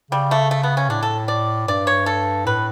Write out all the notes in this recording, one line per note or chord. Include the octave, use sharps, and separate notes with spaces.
C#3 G3
A3
A3
B3
C#4
A2 D4
A4
D5
G2 D5
C#5
A4
A2 B4